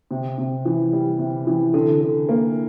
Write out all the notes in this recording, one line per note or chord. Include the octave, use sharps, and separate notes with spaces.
C3
C3
E3
G3
C3
E3
D3
D3
A#3